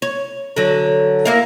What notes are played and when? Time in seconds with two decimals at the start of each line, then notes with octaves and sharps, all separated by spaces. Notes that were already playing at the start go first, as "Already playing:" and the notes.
0.02 C#5
0.56 D3 F#3
1.25 A#3 E4 F5